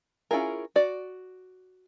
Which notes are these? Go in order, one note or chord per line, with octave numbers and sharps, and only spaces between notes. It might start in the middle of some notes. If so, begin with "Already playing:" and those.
C#4 E4 F4 G#4 A#4
F#4 D5